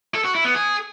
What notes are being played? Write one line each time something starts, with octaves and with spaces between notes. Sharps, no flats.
A4
F#4
E4
B3
G#4